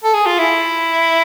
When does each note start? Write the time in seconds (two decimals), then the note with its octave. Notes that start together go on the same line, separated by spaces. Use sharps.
0.04 A4
0.14 G#4
0.26 F4
0.39 E4